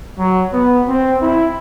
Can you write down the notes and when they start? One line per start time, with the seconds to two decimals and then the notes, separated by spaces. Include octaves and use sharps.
0.18 F#3
0.53 B3
0.88 C4
1.22 E4